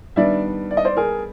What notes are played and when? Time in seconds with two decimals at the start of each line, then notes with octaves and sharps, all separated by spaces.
0.16 D#3 G3 B3 D4 D5 E5
0.71 D5
0.77 D#5
0.85 C5 D5
0.97 G#4 A#4